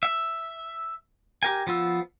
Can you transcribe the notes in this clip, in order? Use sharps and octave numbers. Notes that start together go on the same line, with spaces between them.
E5
G4 A#4 G#5
F3 B3 F4 E6